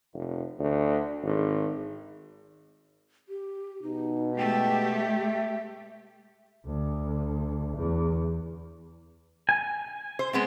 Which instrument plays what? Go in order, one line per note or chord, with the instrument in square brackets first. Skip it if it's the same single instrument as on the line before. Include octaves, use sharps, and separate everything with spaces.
[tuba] F1
D2
G#1
[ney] G4
[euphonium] B2 [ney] D#4
[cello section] G#3 G4 [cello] A3 [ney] G5
[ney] E5
[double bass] D2
E2
[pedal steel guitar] G#5
[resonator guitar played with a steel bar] C5
G#3 B3 C4